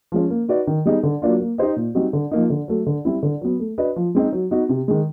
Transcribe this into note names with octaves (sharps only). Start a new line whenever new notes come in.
F3 G#3 C#4
A#3
D#4 F#4 B4 D5
D#3
G3 B3 D#4 G#4
D3
F#3 A#3 D4 F4
A#3
D#4 G4 C5 D#5
A#2
G3 C4 D#4 F#4
D3
F3 A#3 D#4
D3
F#3 A3
D3
G3 C4 E4
D3
F#3 B3
A3
D4 F#4 B4 D#5
F3
G#3 C4 D#4
F#3
B3 D#4 F#4
C3
D#3 G#3